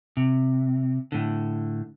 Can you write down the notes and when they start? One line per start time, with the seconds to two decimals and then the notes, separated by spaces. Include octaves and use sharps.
0.17 C3
1.12 A2 D3